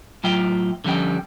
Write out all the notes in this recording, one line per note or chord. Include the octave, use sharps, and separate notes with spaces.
A2 F#3 F4 E5 G5
D3 F3 G3 C#4 G5